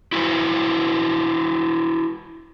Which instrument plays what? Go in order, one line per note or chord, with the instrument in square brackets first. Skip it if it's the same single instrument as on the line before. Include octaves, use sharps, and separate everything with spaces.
[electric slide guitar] E4 F#4 B4 C5